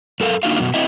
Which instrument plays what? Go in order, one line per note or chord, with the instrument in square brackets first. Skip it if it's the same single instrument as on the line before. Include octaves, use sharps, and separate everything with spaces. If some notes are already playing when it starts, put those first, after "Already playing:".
[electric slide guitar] F#2 A4 A#4 F5
A#3 D4 D#4 F4 F#4 F5
F#2 B2
C4 E4 D#5 E5 F#5